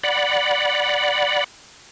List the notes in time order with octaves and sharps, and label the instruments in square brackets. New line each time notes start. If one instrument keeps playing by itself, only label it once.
[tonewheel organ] D5 F#5 B5